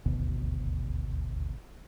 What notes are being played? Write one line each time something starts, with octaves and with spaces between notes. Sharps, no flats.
D#1 G#1 D2 B2